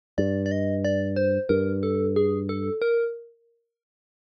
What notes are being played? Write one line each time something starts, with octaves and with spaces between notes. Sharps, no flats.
G2 D5
D5
D#5
D5
C5
G2 A#4
A4
G#4
A4
A#4